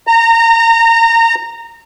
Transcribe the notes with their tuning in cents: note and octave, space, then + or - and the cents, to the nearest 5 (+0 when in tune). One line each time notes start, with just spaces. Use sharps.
A#5 -25